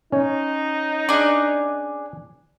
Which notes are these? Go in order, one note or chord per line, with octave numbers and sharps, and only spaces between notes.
C#4 D#4 C#5
D4 G#4